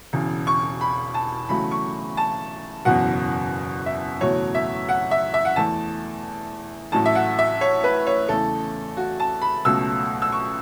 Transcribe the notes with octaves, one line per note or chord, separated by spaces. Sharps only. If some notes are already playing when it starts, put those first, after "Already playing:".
E1 E2 C#3
C#6
B5
A5
E2 C#3 F#3 A3 B5
C#6
A5
F#1 E2 B2 F#3 F#5
E5
F#1 E2 B2 F#3 A3 C#5
E5
F#5
E5
E5
F#5
E2 E3 A3 A5
A1 A2 F#3 A3 A5
E5
F#5
E5
C#5
B4
C#5
E2 C#3 E3 A3 A4
F#4
A5
B5
C#2 B2 F#3 A3 E6
E6
C#6